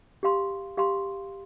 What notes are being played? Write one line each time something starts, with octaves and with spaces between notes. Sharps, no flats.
G4 F5 C6
G4 F5 C6